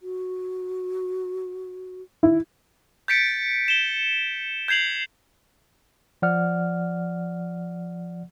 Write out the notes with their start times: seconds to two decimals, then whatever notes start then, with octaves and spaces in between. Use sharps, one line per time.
0.01 F#4
2.23 E4
3.08 G6 A6 B6 C#7 D7
3.68 E7 G7
4.68 G6 G#6 C7 F7 F#7
6.22 F3 D5 F#5 F6